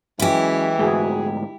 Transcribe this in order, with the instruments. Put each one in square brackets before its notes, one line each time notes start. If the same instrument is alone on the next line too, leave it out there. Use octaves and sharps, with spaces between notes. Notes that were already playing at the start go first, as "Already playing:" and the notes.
[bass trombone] E3 [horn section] F#3 G#3 C#4 [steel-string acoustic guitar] E4 G4
[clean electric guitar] D2 G#2 [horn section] F#4 G#4